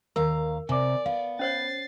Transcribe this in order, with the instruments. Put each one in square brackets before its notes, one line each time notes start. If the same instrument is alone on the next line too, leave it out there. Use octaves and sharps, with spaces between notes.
[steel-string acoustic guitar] D#2 F5 A#5 [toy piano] A#4
[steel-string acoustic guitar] C3 [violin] D5 [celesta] G#5 D6
[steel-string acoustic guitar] B3 [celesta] F5
[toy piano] C#4 C5 C#5 [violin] A6 C7